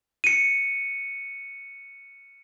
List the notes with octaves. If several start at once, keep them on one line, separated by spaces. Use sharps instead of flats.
C#7 D#7